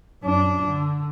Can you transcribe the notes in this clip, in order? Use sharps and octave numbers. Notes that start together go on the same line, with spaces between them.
F#2 D4
D3